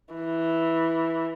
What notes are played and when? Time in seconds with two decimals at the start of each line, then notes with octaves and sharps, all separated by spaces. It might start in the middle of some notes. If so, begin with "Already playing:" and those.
0.14 E3